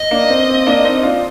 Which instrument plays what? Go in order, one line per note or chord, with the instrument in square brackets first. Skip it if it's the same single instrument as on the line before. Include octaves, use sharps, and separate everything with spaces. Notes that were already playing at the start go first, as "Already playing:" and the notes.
Already playing: [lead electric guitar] D#5
[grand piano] A#3 D4
C4
C4
A#3 D4
C4 D#4
D4 F4